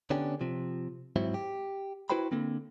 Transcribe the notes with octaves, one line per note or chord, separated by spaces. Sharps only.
D3 B3 C#4 D4 G4
C3 F3
G#2 F#3 C4 E4
G4
E4 F#4 B4 C5 G5 B5
D3 A#3 C4